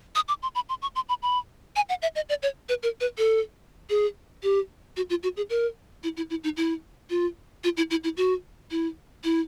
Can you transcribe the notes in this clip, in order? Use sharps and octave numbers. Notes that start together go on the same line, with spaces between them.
D#6
D6
C6
B5
C6
C#6
C6
B5
B5
G#5
F#5
E5
D#5
D5
C#5
B4
A#4
B4
A4
G#4
G4
F#4
F4
F#4
G#4
A#4
E4
E4
E4
D#4
E4
F4
F4
E4
E4
E4
F#4
E4
E4